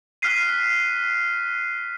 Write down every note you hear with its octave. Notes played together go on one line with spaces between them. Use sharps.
F6 F#6 B6 C7 D#7